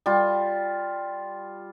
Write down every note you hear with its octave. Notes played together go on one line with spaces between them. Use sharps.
G3 F4